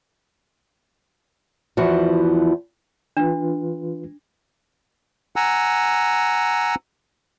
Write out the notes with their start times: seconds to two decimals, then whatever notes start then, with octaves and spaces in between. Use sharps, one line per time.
1.77 E2 E3 F3 F#4
3.17 E3 D4 F4 B4
5.36 F#5 G#5 A#5 E6